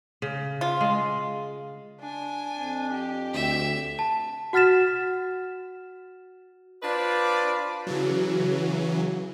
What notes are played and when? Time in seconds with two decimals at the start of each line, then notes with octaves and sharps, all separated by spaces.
0.22 C#3
0.61 F4
0.81 G#3
2.00 D4 G#5
2.54 F2
2.93 G4
3.34 D2 E5
3.99 A5
4.53 F#4 F#5 F6 A6 B6 E7
6.82 D4 F4 B4 C5 D5
7.87 C#3 E3 F#3